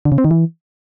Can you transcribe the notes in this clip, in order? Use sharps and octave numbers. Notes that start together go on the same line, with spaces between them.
D3
C#3
C4
D#3
E3